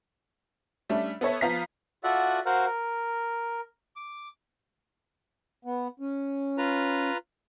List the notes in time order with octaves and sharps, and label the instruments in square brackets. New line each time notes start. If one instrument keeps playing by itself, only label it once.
[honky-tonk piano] G3 A3 C#4 D4
B3 A4 C#5 E5
F3 B3 F5 A#5 B6
[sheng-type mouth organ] F4 F#4 A4 D5 E5 F#5
F#4 A#4 C5 F5 F#5
A#4
D6
[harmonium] B3
C#4
[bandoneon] F4 B4 A#5